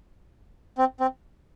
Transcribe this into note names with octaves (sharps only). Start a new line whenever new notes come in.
C4
C4